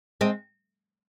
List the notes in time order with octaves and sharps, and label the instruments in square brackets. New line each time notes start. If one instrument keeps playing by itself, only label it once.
[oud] G#3 C4